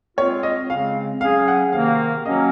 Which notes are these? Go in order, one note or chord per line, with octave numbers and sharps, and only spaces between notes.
G#3 C4 F4 C#5
D#5
C#3 G#3 C4 F5
C#3 F#3 C#4 G#4 F5
F#5
C3 D#3 A#3 F5
F#3 A#3 C#4 D#5